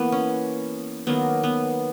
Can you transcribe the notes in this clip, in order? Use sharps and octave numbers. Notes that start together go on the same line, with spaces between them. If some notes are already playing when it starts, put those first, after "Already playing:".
Already playing: E3 A#3 B3
C#4
D#3 F#3 A#3 B3
B3